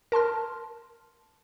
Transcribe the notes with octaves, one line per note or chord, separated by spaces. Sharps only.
A#4 A5 C6 F6